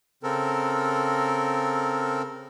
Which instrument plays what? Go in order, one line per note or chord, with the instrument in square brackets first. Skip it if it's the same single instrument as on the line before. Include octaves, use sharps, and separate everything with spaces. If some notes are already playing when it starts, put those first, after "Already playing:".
[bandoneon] C#3 C4 A4 A#4